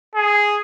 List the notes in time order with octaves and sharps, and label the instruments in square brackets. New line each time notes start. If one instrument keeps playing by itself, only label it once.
[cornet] G#4